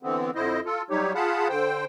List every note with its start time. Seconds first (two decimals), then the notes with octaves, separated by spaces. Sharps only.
0.03 D3 E3 B3 C4
0.35 F2 D3 E4 C5 D#5
0.65 F4 A4
0.90 F#3 G3 D#4 G4 C#5
1.15 F4 G#4 F5 F#5 A5 B5
1.49 D3 C5 G5